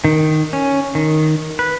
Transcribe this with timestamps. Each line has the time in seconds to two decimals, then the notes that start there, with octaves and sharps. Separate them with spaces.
0.05 D#3
0.53 C#4
0.95 D#3
1.59 B4